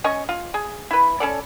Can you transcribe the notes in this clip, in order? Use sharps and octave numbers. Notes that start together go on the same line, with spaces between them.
C#4 D#5 C#6
F4
G#4
E4 B4
C#4 A4 D5